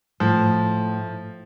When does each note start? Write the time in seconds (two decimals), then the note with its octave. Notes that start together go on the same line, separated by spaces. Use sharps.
0.20 A2 F3